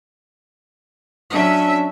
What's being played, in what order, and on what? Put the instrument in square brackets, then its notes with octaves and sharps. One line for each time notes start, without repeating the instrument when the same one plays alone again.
[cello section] F#3 C#4 E5 [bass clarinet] D4